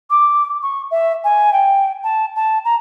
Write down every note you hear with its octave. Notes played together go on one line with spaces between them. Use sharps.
D6
C#6
E5
G#5
G5
A5
A5
A#5